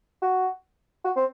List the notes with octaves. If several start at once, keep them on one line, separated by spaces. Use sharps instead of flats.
F#4
F#4
C4